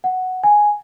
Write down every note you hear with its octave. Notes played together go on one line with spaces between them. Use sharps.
F#5
G#5